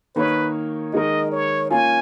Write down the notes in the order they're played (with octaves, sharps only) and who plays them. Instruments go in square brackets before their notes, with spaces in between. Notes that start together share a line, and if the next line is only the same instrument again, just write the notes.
[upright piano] D#3 A#3 D#4 A#4 C#5 [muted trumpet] B4
[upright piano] D#3 G#3 D#4 A#4 [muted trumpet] D#5
[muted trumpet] C#5
[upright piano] A#3 C#4 F4 [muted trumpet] G#5